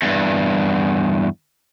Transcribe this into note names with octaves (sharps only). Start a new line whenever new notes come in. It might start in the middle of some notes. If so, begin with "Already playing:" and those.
E2 G2